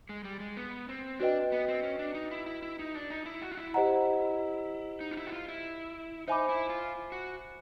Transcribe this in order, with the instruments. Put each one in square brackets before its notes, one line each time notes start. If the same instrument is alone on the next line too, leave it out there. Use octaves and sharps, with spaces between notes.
[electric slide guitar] G#3
G3
G#3
B3
C4
[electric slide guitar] D4 [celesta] F#4 B4 D#5 G5
[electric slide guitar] B3
C4
C#4
D4
D#4
E4
E4
E4
D#4
D4
D#4
E4
F#4
F4
E4
[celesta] G4 C5 D#5 F#5 A#5
[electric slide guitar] D#4
F4
E4
F#4
F4
E4
[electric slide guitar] D#4 [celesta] C5 E5 G#5 B5 D6
[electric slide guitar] E4
F4
F#4